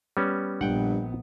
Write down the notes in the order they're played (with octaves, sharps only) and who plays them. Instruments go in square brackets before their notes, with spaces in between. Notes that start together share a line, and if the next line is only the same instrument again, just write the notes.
[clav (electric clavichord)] G3 B3 C#4
[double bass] A#1 B3 [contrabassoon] G2 [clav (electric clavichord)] F#5 G5